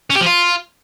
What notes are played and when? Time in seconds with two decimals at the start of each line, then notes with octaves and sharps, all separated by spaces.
0.10 C#4
0.16 G4
0.21 F3
0.26 F4